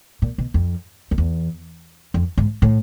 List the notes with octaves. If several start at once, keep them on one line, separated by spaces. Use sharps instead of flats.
A#2
B2
F2
F2
E2
F2
G#2
A2